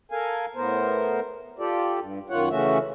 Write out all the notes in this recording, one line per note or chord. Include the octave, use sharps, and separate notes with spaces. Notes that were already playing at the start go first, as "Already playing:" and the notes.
A4 A#4 F5 G#5
A2 B3 A#4 C5
F4 G4 A4 D5
G2
F#2 D#3 F4 C#5 F#5
C#3 E3 A3 C#4 F#4 E5